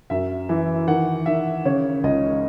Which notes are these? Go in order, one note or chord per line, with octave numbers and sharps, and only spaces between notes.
F#2 E5
E3
D#3 F#5
D#3 E5
C#3 C#5
C#2 D#5